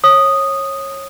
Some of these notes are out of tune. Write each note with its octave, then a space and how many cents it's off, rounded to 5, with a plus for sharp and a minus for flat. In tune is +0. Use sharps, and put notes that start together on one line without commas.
C#5 -25 D#6 -5